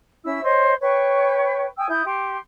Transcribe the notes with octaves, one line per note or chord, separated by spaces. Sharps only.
C#4 E4 E5 E6
C5 C#5 D#5
B4 C#5 G5 C#6
G5 G#5 D#6 E6
E4 D#6 G6
G4 C6